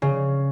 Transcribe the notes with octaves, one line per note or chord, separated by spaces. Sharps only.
C#3